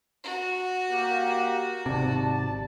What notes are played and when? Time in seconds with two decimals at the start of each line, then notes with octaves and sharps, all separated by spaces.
0.24 F#4
0.90 A#3 G4
1.86 G#1 C3 D5 A5